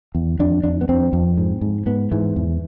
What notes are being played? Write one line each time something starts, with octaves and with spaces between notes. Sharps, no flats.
E2
F2 D4
F2 D4
B3
F2 C4
F2
G#2
G#2
G#2 B3
G#2 E3
E2